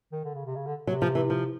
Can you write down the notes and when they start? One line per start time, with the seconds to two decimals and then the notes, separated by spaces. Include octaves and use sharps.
0.12 D#3
0.24 D3
0.34 C#3
0.45 C3
0.55 C#3
0.66 D3
0.87 C3 F#3
1.02 F3
1.15 E3
1.30 F3